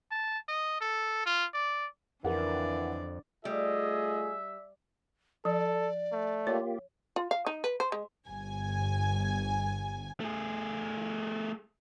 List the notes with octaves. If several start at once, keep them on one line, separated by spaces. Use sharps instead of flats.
A5
D#5
A4
F4
D5
F2 D3 E3 A#4 D5 F#5
G3 A3 F4 G#4 D#5 E5
F3 A4 D5
A3
A#3 F4 G4 C#5
F4
F5
D#4
B4
C5
G#3
G1 G#5
A3 G#4